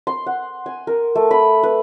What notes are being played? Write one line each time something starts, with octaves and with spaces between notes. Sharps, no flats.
C6
F#5
G#5
A#4
A3
B5
B4